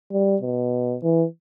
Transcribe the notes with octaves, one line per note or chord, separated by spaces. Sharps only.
G3
B2
E3